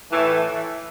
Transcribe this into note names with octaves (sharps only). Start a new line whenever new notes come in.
A2 E3 A3